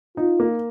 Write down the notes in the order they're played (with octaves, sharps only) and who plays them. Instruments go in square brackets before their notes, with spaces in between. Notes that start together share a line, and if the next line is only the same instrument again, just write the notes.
[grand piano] D#4 [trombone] F4
[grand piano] A#3